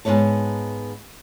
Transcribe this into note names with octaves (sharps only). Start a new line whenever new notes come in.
G#2 D#3 B3 C#5 A5